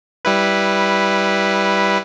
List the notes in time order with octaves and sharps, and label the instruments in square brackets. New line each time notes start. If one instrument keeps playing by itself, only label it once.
[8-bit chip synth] G3 E4 B4